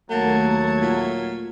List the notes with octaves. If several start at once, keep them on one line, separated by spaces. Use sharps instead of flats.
D#2 F#3 A3 A#3 F#5 A5 G#6
A#2